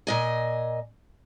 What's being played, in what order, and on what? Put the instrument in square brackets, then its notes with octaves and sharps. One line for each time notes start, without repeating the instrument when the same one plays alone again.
[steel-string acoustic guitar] A#2 D#5 G#5